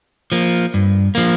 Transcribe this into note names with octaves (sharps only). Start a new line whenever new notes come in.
F3 A#3
G2
F3 A#3